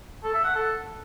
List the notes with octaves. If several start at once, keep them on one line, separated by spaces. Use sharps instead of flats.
A4
E5
F#5
A4